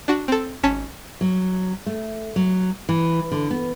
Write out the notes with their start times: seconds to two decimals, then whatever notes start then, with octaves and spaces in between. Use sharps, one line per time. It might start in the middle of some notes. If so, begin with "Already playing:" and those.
0.08 D4 F#4
0.28 C4 A4
0.63 G#1 C#4 A5 B6
1.21 F#3
1.86 A3
2.36 F#3
2.89 E3
3.32 D3
3.50 B3